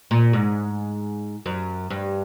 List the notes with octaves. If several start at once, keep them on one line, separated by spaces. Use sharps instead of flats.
A#2
G#2
F#2
G2